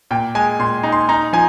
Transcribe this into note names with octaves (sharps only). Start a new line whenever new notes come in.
A#2 G5
G#3 G#5
A#2 C6
D#4
C6
D#4 A#5
F3 G#5